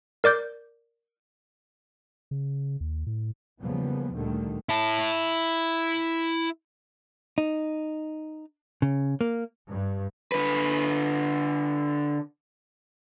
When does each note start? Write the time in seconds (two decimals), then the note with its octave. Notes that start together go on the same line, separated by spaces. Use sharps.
0.24 A#4 D5 D6 G6
2.31 C#3
2.81 D#2
3.06 A2
3.60 E2 C#3 F3 G3 A#3 B3
4.14 D2 A#2 D3 D#3 G3 A3
4.69 E4 A5
7.38 D#4
8.82 C#3
9.21 A#3
9.70 G2
10.32 D3 B4